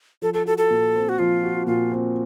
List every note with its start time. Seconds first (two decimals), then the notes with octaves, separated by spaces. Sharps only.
0.22 F3 A4
0.34 A4
0.46 F#4 A4
0.58 A4
0.70 A#2
0.95 C4
1.09 F#4
1.19 F3 F4
1.43 F#4
1.67 A#2 F4
1.92 C4